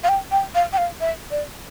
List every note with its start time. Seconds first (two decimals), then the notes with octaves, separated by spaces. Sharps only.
0.04 F5
0.09 G5
0.31 G5
0.55 F5
0.73 G5
0.78 F5
1.01 E5
1.31 D5